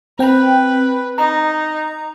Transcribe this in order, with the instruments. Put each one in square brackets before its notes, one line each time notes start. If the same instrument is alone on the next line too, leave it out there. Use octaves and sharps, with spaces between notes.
[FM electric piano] C4 G5 [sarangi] B4
[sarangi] D#4 [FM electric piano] A#5